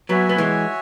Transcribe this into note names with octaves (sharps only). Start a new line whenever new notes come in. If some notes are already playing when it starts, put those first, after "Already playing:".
F#3 B3 F#4 C#5 E5 G#5
B3
E3 G#3